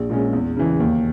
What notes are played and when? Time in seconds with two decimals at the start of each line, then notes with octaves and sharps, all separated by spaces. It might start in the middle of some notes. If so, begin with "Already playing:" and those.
Already playing: A#1
0.10 A#2 G#3 C#4
0.33 E2
0.57 C#3 E3
0.80 D#2